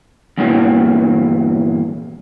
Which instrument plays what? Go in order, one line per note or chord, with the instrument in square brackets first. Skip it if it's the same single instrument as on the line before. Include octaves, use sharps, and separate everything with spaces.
[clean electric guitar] E2 G2 A#2 E3 F#3 A#3